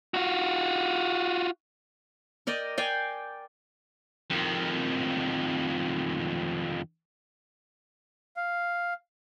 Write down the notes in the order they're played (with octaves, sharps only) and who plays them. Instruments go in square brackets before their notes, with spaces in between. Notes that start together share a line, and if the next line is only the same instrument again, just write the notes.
[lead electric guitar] F4 F#4
[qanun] A#4 D5 D#5 G5
D5 F5 G5 G#5
[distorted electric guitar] F2 D#3
[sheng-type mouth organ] F5